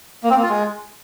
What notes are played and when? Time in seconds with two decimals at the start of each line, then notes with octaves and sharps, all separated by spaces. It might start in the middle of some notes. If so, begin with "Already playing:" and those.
0.23 A#3
0.30 C4
0.36 A#3
0.43 F4
0.49 G#3